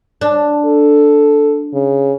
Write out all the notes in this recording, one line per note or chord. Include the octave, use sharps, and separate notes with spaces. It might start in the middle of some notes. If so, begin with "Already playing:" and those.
D4
A4
C#3